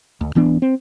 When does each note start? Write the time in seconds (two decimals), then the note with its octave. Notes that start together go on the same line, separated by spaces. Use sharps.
0.21 D2
0.35 D1 E3 B3 D4
0.62 C4